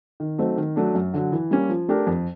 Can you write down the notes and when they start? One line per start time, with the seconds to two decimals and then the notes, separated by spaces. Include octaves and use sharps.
0.20 D#3
0.38 F#3 A3 C4 D#4
0.57 D#3
0.76 F#3 A3 D4
0.95 F#2
1.14 D3 F#3
1.32 E3
1.51 G3 A#3 C#4
1.69 F3
1.88 A3 D4 G4 A#4
2.07 F2